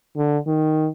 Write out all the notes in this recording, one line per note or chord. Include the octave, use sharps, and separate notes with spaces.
D3
D#3